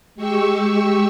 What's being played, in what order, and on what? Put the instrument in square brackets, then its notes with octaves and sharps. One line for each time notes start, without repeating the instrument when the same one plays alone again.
[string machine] G#3 G4 C#6 E6